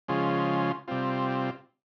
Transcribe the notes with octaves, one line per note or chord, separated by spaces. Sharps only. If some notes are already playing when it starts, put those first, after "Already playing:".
C#3 F3 G#3 C#4 F4
C3 G3 C4 F4